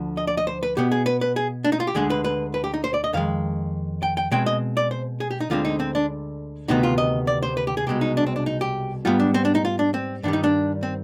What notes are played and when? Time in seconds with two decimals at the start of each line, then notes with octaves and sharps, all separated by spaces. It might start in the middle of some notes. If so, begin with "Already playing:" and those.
Already playing: D2 D3 F3
0.17 D#5
0.27 D5
0.37 D#5
0.47 C5
0.63 B4
0.77 B2 B3 G4
0.92 G#4
1.06 B4
1.21 B4
1.36 G#4
1.64 D4
1.72 D#4
1.80 F4
1.87 G4
1.95 D2 D3 G#3 G#4
2.10 B4
2.24 B4
2.54 B4
2.64 G4
2.74 D#4
2.84 C5
2.94 D5
3.04 D#5
3.13 F2 D#3 G#3 F5
4.03 G5
4.17 G5
4.31 B2 G#3 C4 G5
4.46 D#5
4.77 D5
4.91 C5
5.20 G#4
5.31 G4
5.40 D#4
5.50 D2 D3 G#3 C4 F4
5.65 D#4
5.80 C4
5.95 D4
6.68 D2 C3 D#3 B3 D#4
6.83 F4
6.98 D#5
7.27 D5
7.43 C5
7.57 B4
7.67 G4
7.77 G#4
7.87 C2 B2 G#3 G4
8.01 D#4
8.17 D4
8.27 C4
8.36 D4
8.46 D#4
8.61 G4
9.05 G#2 G3 B3 F4
9.20 D4
9.34 C4
9.45 D4
9.55 D#4
9.65 F4
9.79 D4
9.94 C4
10.23 G2 D#3 G3 D4
10.33 D#4
10.44 D4
10.83 C4